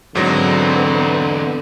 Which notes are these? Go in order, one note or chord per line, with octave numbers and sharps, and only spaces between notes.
G#2 B2 D3 E3 F#3 B3 C4 A#6